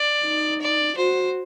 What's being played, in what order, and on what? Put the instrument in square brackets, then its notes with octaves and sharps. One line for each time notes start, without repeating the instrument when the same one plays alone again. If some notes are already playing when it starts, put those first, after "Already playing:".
Already playing: [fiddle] D5
[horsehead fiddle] D#4
[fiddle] D5
[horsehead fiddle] F#4 [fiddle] C5